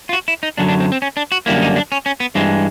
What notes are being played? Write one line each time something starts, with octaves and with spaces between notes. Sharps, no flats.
F4
F#4
E4
D#4
F#2 D3 F#3 D4
D4
C4
C4
C#4
D4
F#4
F#2 D3 G3 A#3 E4
D#4
D4
C#4
C#4
B3
G2 E3 G#3 C4